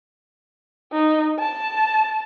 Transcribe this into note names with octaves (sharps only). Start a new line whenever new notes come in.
D#4
A5